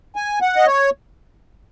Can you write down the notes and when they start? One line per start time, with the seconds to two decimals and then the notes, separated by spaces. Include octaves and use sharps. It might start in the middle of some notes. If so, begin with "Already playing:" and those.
0.16 G#5
0.42 F#5
0.56 D#5
0.67 C#5